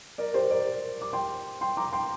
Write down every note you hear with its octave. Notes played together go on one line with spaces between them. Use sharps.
A#4 D5
G4 C5
A#4 D5
D6
G5 C6
G5 C6
A#5 D6
G5 C6